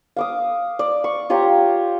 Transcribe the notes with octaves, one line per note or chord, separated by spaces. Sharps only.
F5 D6 D#6
D5
C#6
F4 G4 C#5 A#5